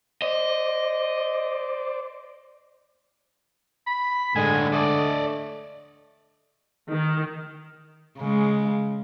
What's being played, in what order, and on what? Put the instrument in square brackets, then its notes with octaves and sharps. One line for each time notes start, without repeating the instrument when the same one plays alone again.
[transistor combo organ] C5 D5 [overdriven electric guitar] D#5
[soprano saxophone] B5
[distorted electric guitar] A2 G#3 [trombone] D3 [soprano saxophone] G#5
[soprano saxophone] A3 [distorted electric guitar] D5 D#5
[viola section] D#3
[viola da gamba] C#3 G#3